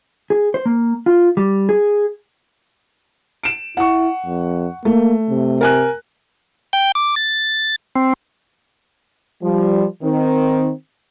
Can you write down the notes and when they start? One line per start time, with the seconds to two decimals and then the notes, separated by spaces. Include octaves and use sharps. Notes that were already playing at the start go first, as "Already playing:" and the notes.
0.30 G#4
0.54 C5
0.66 A#3
1.06 F4
1.37 G3
1.69 G#4
3.43 D7 E7
3.77 E4 F#5 C#6
4.26 F2
4.85 A3 A#3
5.30 C3
5.61 A#4 G#5 F#6
6.73 G5
6.95 D6
7.16 A6
7.96 C4
9.43 F3 G3
10.02 D#3 C4